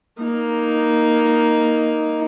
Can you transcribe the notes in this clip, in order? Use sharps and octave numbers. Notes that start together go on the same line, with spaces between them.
A#3 D#4